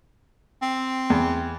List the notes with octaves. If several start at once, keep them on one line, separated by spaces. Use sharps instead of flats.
C4
E2